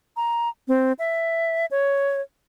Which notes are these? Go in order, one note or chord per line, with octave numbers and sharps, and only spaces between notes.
A#5
C4
E5
C#5